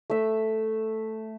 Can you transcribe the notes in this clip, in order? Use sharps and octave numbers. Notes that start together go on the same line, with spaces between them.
A3 E5